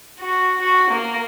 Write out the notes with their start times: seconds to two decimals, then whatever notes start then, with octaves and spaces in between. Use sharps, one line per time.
0.21 F#4
0.62 F#4
0.92 A#3